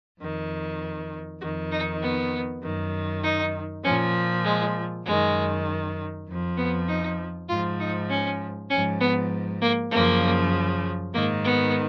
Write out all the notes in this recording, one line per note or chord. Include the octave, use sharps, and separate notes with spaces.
F2 D#3
F2 D#3 F#4
D#4
B3
F#2 D#3
D#4
A#2 F3 C#4
G#3
F#2 D#3 G#3
F2 F3
B3
D#4
G#2 F3 F4
D#4
C#4
G#2 F3 C#4
B3
A#3
F#2 C#3 F3 A#3
G#2 D#3 A#3
B3